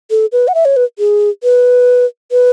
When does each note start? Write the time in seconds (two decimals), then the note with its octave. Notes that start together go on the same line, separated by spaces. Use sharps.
0.10 A4
0.32 B4
0.48 F#5
0.54 E5
0.65 C#5
0.76 B4
0.98 G#4
1.43 B4
2.31 B4